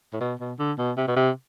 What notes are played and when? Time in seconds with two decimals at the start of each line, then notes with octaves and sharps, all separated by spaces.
0.13 A2
0.20 B2
0.39 B2
0.59 D3
0.78 B2
0.97 C3
1.08 B2
1.16 C3